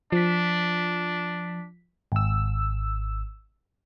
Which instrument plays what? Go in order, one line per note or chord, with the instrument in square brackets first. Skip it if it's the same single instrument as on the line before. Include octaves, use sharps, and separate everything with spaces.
[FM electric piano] F3 B6 [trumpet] D4
[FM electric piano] G#1 E6